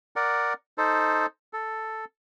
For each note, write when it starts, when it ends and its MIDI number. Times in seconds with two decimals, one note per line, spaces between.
0.16 0.53 70
0.16 0.53 74
0.16 0.53 78
0.78 1.26 63
0.78 1.26 69
0.78 1.26 72
1.53 2.05 69